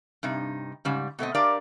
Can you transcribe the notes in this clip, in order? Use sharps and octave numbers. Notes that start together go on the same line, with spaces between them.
G2 C3 D#4
G#2 C#3 G3
B2 A3 C4 D#5
D4 G4 A#4 D5 F5 A#5